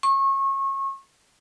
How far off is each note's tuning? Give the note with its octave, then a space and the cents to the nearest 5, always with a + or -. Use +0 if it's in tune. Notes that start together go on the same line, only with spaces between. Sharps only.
C#6 -30